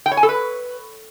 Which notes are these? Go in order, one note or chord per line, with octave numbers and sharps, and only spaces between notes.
G5
C#5
G#5
A4
B4